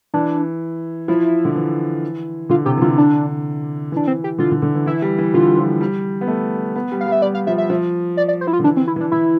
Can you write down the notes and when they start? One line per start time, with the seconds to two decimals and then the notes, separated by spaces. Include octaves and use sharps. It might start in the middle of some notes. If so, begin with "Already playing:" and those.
0.14 E3 D4
1.08 F3 E4
1.45 D3
1.55 E3
2.50 D3 F4
2.66 C3 G4
2.77 E3
2.82 D3 F4
2.98 D4
3.92 E3 D4
4.07 C4
4.24 G4
4.39 D3 F4
4.51 D3
4.62 D3
4.75 E3
4.86 E3 E4
5.02 G3
5.19 E3
5.34 D3 F4
5.47 G3
5.57 F3
5.81 G3
6.21 B3
6.28 A3
6.76 B3
6.92 G3
7.01 F5
7.06 G3
7.12 E5
7.22 G3 D5
7.34 F5
7.47 F3 E5
7.58 E5
7.70 F3
8.17 D5
8.28 D5
8.41 C5
8.47 E4
8.53 F4
8.59 D3
8.64 E3 D4
8.77 C4
8.88 E4
8.96 E3 D4
9.12 E3 E4